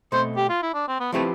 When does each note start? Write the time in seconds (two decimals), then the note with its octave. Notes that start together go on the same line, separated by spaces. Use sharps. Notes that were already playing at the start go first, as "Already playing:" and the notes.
0.12 B2 A3 C4 C5
0.37 G4
0.49 F4
0.63 E4
0.74 D4
0.88 C4
1.00 B3
1.12 F3 A3 C4 E4 G4 B4